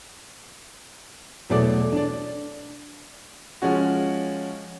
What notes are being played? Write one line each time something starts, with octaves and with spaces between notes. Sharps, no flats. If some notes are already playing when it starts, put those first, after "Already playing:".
E2 B2 F#3 A3 D5 D6
D4 D5
F3 G#3 C#4 F#4